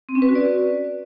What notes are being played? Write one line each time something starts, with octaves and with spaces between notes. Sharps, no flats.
C4
C#4
B4
F#4
D5